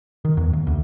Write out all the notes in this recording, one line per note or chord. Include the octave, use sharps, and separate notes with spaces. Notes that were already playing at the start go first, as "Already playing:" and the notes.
D#3
E2
D#2
D2